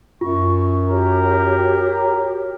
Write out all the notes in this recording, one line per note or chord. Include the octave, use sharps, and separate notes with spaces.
F#2 F4 C#6
F#4 G4 A#4 C#5